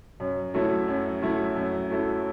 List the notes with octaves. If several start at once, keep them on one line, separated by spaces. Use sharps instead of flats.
F#2
F#3 A3 E4
F#2
F#3 A3 E4
F#2
F#3 A3 E4